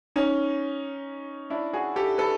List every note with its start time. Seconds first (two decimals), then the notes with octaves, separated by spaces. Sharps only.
0.16 C#4 D#4
1.50 D4 E4
1.73 F#4 G#4
1.96 G4 A4
2.18 A4 B4